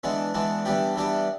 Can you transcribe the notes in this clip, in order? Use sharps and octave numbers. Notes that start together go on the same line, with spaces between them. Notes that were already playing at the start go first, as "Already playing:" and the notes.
E3 G#3 B3 D4
E3 G#3 B3 D4
E3 G3 B3 D4 G4
E3 G3 B3 D4 G4